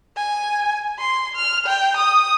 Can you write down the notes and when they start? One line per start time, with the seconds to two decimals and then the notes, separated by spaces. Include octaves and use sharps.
0.17 G#5
1.00 C6
1.36 F6
1.67 G5
1.97 D#6